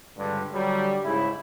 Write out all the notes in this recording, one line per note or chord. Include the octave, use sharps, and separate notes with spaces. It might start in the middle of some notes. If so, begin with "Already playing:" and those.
C#2 G2 D3 G3 D4
D3 F#3 G3
G#2 C#3 E4